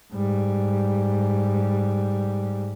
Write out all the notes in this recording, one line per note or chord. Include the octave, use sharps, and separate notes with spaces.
G#2 G3